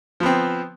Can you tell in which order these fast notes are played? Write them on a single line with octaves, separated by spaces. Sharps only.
F3 B3 C4